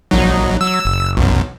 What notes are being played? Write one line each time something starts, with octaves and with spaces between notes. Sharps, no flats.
A#1 F#3 D#4
F#3 E6
F#1
B1 F#2